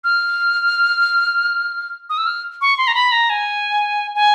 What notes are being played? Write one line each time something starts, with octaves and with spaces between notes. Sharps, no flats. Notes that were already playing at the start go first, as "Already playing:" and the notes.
F6
D#6
E6
F6
C#6
C6
A#5
B5
A#5
G#5
G#5